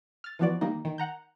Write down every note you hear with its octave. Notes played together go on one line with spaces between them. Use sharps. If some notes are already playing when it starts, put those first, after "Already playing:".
F6 A6
E3 F3 B3 F#4 D5
D#3 G3 A#3 D#4
D#3
F#5 A#5 G6